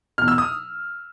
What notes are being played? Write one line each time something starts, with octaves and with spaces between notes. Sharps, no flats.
E2 B2 F6
E6
D#6